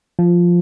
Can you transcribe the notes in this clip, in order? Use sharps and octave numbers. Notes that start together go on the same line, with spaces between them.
F3